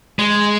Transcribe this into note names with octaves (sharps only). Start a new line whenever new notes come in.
G#3